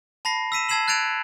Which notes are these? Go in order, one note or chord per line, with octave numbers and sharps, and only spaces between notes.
A5 B5 A#6 C7
E6 B6 D#7 E7
A5 E6 G#6 C7 E7 F#7
F#6 G#6 A6 D7 F7